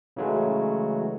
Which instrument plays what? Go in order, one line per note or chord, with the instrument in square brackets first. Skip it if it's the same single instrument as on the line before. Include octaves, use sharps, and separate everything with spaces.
[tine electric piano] C#3 E3 F#3 G#3 A3